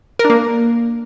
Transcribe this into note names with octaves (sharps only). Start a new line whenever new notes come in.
A#4
D4
A#3